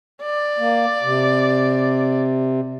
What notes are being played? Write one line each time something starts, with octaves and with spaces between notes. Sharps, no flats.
D5
A#3
C3